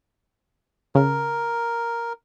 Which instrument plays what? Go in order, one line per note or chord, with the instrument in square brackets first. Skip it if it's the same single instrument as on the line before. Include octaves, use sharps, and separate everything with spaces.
[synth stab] C#3 [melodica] A#4